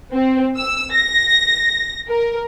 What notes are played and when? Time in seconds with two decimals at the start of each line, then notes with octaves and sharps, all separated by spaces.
0.13 C4
0.57 E6
0.93 A#6
2.08 A#4